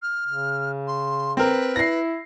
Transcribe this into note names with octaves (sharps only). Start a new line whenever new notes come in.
F6
C#3
C6
C4 A#4 B4
E4 A#6 C7